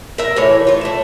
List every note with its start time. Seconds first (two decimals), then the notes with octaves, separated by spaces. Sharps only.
0.18 A#4 E5
0.36 A2 E3 C#5
0.67 F4 C#5
0.81 A3 E5